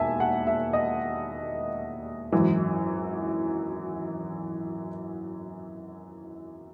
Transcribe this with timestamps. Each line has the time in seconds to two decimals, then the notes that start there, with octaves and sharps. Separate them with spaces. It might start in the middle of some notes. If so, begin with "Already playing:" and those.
Already playing: E1 D#2 E5 G#5 A5
0.20 F#5
0.47 E5
0.73 D#5
2.32 G#1 F#2 E3